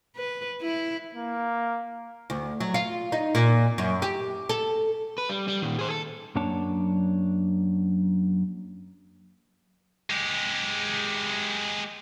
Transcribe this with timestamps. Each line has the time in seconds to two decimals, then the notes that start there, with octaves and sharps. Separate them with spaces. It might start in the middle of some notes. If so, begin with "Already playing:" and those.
0.16 B4
0.61 E4
1.15 A#3
2.30 D2
2.60 F#3
2.74 F4
3.12 D#4
3.35 A#2
3.78 F#2
4.02 G4
4.49 A4
5.18 B4
5.29 G3
5.48 G3
5.62 A#2 D#3
5.79 G#4 C5
5.90 A4
6.36 F#2 F#3 A#3 D4 C#5 A5
10.10 G#3 G4